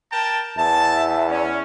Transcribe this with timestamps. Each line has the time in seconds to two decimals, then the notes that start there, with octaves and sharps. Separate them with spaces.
0.12 A#4 G5 A5
0.57 E2 E5 A5
1.30 C#4 D5